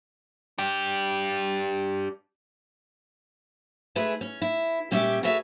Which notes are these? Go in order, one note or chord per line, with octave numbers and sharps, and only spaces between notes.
D4 G4
G#3 A3 E4 G#4 B4
C#4
E4
A#2 G3 C#4 G4 E5
F#4 G#4 A4 B4 C#5 E5